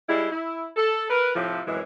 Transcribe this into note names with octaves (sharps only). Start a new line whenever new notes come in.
G3 G#3 E4
E4
A4
A#4 B4
A2 C3 F3
F#2 A2 C3 D#3 E3 G#3